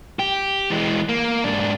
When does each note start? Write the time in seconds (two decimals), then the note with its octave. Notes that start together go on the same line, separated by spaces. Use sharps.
0.19 G4
0.71 E3 G#3
1.09 A#3
1.44 G#2 D4